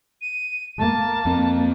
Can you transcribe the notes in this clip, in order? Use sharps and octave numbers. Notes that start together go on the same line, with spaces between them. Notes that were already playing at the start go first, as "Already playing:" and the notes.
D#7
A#3 A5
F2 C4